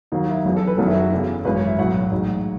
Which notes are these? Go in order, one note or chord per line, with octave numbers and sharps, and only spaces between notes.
D#2 D#3 F#3 D#4
E4
F#1 F#2 E3
A4
B4
F#1 F#2 D#3 F#3 A4
E4
F#4
A4
E2 C#3 E3
G#1 F#2 E3 B4
C#5
E5
B1 A2 F#3 F#5
A1 G#2 F#3